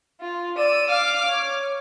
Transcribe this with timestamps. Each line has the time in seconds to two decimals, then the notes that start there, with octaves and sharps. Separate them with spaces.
0.21 F4
0.58 D5 E6 D#7
0.90 F5 D6 F6
1.25 C#5